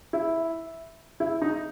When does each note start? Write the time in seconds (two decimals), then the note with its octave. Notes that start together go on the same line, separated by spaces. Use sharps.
0.13 E4
1.20 E4
1.42 D#4